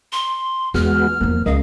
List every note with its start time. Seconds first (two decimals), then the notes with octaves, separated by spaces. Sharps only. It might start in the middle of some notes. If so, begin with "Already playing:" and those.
0.12 C6
0.74 E2 G#3 B3 F#4 F6
1.21 E2 F3 A#3 B3
1.46 C#2 A#4 D#5 F5